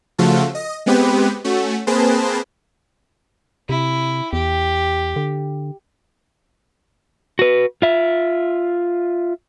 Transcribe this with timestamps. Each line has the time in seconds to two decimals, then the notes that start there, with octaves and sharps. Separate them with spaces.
0.18 C#3 F3 A3 F4 F#4 A4
0.55 D#5
0.86 G#3 B3 C4 G4 B4
1.44 A3 C#4 F#4
1.87 A#3 C4 G#4 B4 C5 A5
3.69 C3 E4
4.33 E2 G4
5.16 D3
7.39 F#4 B4
7.82 F4 E5